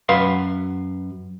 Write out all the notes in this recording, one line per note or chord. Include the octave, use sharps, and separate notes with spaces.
F#2 B4 F5 C6